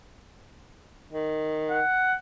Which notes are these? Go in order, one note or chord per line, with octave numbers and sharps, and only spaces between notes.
D#3
F#5